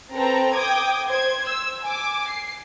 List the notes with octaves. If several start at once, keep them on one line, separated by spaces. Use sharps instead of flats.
C4 A4 B4 A#5
G5 D6 D#6 G#6
C5 G#6
E6
G#5 D6
C7